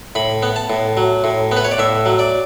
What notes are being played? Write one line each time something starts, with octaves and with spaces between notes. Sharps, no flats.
A2 B5
B3
A5
A2
F#3
A2
B3
B4
C#5
D5
A2 E5
F#3
D5